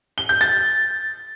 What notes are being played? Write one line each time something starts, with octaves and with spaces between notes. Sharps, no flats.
G7
G6
A6